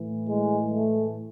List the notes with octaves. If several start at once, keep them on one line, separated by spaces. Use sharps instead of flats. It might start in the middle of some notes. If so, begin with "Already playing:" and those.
Already playing: A2 E3
G#3
A3